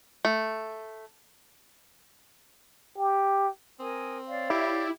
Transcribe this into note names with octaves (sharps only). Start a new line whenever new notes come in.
A3
G4
C4 A#4 G#5 D#6
C#5 D5 F5
E4 G4